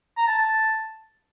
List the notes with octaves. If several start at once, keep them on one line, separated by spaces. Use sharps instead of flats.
A#5
A5
A5